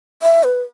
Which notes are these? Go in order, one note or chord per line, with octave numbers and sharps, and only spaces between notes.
E5
B4